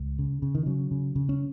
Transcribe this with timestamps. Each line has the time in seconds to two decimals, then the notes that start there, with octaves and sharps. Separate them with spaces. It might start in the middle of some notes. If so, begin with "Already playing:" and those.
Already playing: C#2
0.19 C#3
0.42 C#3
0.55 D#3
0.66 C#3 F#3
0.91 C#3
1.16 C#3
1.29 C#4